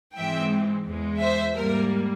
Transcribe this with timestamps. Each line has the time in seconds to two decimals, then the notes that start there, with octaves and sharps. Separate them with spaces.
0.15 G#2 E3 G#3 C4 E5 G5
0.86 E2 E3 G#3
1.20 C5 E5
1.55 G#2 G3 A#3 A#4